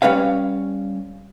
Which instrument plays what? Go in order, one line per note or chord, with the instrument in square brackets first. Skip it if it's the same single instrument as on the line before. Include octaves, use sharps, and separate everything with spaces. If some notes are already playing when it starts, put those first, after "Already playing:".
[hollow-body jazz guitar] G3 C#4 B4 C#5 F5